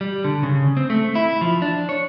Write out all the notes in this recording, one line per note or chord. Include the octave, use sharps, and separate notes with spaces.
G3
D3
C#3
C4
A3
E4
F3
D4
C#5